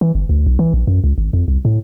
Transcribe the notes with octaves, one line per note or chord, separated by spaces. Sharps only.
E3
G1
D2
B1
E3
A#1
F#2
C#2
G#1
F2
C2
A2